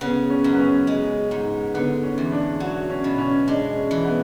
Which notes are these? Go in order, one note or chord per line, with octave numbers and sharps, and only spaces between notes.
C#3 B3
C#4
F#2
B3
C#4
G#3
G#2
D3 B3
C#4
E2
D4
F#3 F#4
C#4
B2
C#4
G#3 D4
C#4
E3
B3